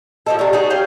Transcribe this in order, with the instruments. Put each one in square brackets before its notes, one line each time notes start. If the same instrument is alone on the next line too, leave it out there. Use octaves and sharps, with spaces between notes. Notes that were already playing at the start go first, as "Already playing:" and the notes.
[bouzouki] F3 A3 A4 [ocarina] D#5
[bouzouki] C3 A3 [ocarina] D5
[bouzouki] D#4 F#4 G#4
C#4 G4 F5